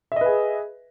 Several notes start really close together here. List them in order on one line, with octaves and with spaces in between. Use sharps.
E5 D#5 B4 G#4